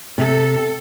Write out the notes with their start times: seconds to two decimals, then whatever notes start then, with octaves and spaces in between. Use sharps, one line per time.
0.18 C3 A4